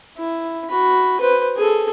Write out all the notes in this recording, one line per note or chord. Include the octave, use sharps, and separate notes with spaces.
E4
F#4 B5
B4 C5
G#4 A4